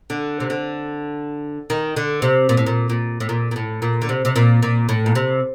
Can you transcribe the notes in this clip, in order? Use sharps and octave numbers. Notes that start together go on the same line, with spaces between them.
D3
C3
D3
D#3
D3
C3
A#2
A2
A#2
A#2
A2
A#2
A#2
A2
A#2
D3
C3
C3
A#2
A#2
A2
A#2
C3